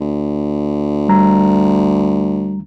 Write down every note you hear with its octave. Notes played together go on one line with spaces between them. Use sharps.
D2
G3 A#5